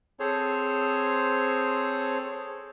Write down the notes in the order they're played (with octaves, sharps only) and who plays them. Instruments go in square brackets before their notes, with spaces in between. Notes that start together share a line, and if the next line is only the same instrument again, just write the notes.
[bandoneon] C4 G#4 A4 C5 C#5